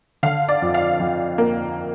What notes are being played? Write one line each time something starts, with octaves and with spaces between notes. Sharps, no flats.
D3 F5
D5
F2
F5
F2
A#3